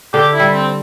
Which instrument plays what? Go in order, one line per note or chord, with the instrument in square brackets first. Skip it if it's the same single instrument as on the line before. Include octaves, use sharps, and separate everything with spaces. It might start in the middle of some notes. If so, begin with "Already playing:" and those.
[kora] D3 [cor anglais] G4
[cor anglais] E4
[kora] G3
[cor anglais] C4